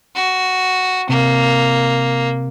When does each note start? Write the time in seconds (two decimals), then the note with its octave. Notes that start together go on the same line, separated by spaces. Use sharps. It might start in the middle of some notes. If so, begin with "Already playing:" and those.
0.15 F#4
1.09 C3 A#3